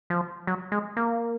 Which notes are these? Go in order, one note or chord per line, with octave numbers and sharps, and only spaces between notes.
F3
F#3
G#3
A#3